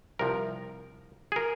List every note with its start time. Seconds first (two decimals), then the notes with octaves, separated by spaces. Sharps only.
0.19 C2 C3 F3 A#4
1.32 G#4
1.36 A#4